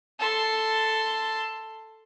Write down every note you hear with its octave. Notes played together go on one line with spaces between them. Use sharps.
A4 C6